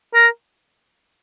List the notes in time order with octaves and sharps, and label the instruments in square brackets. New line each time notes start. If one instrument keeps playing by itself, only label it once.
[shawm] A#4